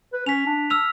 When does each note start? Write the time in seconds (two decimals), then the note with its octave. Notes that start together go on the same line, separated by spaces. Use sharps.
0.13 B4
0.26 C#4 B6 F7
0.46 D4
0.70 E6 F6 F7